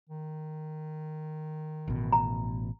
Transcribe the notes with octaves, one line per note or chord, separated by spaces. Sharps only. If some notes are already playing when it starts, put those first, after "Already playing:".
D#3
A1 B2
A#5